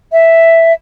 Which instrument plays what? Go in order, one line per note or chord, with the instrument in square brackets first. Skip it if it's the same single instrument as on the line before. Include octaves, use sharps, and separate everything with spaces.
[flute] E5